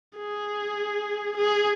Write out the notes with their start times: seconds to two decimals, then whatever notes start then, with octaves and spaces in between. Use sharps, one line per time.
0.17 G#4
1.36 G#4